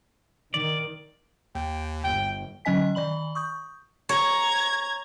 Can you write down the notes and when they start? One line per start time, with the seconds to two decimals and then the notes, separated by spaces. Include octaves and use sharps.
0.54 D#3 D5
1.55 D#2 G5
2.04 G1 G5
2.65 D3 F#3 C#4 D#5 G#5 B6
2.95 D#3 D5 B5 F#7
3.35 C#6 D#6 G6
4.09 C#5 A#5 G#6